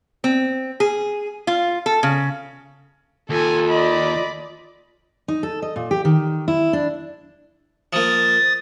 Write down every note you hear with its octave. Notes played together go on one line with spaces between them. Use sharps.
C4
G#4
F4
A4
C#3
D#2 F4 A4 G#5
D5 D#5 B5
D#4
A4
D#5
A#2
G4
D#3
E4
D4
F3 A#3 D#6 A6